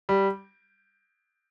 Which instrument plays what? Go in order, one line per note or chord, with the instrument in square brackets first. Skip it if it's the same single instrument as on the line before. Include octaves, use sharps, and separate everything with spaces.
[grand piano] G3